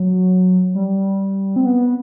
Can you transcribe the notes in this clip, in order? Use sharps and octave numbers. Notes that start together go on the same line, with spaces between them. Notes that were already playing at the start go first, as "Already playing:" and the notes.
Already playing: F#3
G3
C4
B3